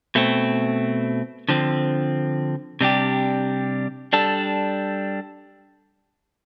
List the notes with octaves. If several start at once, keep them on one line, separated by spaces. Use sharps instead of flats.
B2 A3 C4
D3 F3 C4
C3 G3 D4 G4
G3 D4 A4